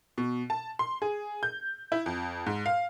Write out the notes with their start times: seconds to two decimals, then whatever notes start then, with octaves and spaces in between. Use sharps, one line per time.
0.18 B2
0.50 A5
0.79 C6
1.02 G#4
1.43 G6
1.92 E4
2.06 F2
2.46 G#2
2.66 F5